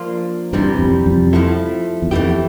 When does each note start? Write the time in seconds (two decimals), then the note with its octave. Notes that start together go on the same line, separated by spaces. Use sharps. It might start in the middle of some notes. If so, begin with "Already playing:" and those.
Already playing: F3 A#3 D4 F4
0.53 G2 C3 E3 G3
0.79 F2
1.06 F2
1.33 F3 A3 E4 A4
2.02 E2
2.11 F2 E3 A3 E4 G4